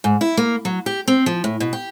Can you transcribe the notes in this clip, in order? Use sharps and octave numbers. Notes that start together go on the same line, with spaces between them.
G#2
E4
A#3
F#3
G4
C4
F3
A2
B2
G4